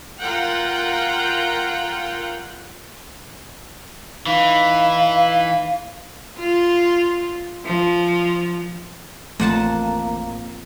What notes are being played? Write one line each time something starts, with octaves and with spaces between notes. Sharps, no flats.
F4 A#4 F#5 G5
E3 D#4 F5
F4
F3
A1 F2 A3 A#3 F#5 A5